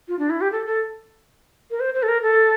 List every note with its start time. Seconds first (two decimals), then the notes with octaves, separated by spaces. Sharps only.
0.08 F4
0.19 D4
0.30 E4
0.41 G4
0.52 A4
0.66 A4
1.71 A#4
1.80 C5
1.94 C5
2.03 A4
2.08 A#4
2.23 A4